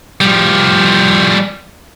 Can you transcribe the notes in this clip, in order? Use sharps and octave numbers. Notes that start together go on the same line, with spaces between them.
F3 G3